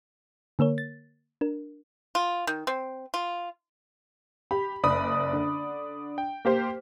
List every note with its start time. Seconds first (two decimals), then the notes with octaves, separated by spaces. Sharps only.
0.59 D3 A#3 A#4 C#5
0.78 A6
1.41 D4 A#4
2.15 F4
2.47 D#3
2.67 C4
3.14 F4
4.51 G4 B5
4.83 F#1 D5 B5 D#6
5.33 D3
6.18 G5
6.45 A#3 G4 C5